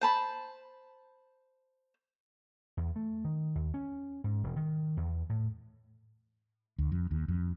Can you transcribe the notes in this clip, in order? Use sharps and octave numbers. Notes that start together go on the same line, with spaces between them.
C5 A5 B5
E2
A3
D#3
D#2
C#4
G#2
E1
D#3
E2
A2
D2
F2
D#2
F2